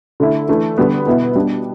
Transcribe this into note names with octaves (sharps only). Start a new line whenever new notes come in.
D3 A3 E4
E3 A3 D4
D3 G3 B3
B2 B3 E4
B2 G3 D4